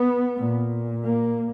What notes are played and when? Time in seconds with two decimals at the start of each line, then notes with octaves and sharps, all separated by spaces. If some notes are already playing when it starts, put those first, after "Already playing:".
Already playing: B3
0.36 A#2
1.04 A#3